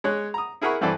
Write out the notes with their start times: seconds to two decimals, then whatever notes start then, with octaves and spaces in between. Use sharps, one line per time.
0.04 G#3 C#5 F#6
0.34 A#5 D#6
0.62 E4 G#4 A#4 F#5 B5 C#6
0.81 G2 E3 C4 A4 D5